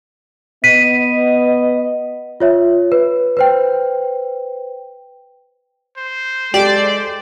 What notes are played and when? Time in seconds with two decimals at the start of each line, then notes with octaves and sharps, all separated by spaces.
0.64 B3 D#5 B6 D#7
2.40 F4 C#5 E5
2.92 B4
3.37 B4 C5 G5
5.98 C5
6.54 G#3 G4 A4 D5